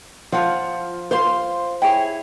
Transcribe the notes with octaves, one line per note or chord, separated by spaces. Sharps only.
F3 F4 F#5 D#6
F4 C5 F5 C6
E4 G#4 C#5 G5